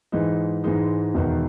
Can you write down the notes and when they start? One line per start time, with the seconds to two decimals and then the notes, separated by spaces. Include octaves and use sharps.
0.12 G#2 E3 G#3 D#4
0.64 G#2 E3 G#3 D#4
1.15 E1 E2 D#3